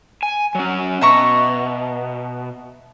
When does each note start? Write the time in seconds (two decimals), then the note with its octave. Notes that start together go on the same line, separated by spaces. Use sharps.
0.23 G#5
0.55 F#3 C#4
1.01 B2 E5 A#5 C#6